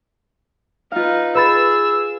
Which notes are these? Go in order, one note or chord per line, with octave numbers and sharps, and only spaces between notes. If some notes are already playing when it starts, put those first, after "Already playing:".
D#4 F4 B4 F5
G#4 B4 B5 E6 A6